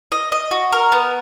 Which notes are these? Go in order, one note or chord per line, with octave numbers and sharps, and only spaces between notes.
D#5
D#5
F#4
A#4
B3